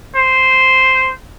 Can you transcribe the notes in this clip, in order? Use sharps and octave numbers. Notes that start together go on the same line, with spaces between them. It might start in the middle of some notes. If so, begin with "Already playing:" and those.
C5